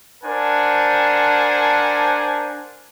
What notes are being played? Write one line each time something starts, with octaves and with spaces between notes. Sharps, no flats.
D4 A#4 C5 F#5 G#5 A5